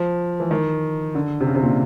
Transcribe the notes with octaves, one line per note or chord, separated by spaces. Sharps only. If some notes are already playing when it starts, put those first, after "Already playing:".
Already playing: F3
E3
D#3
D3
C3
C#3
C3
A#2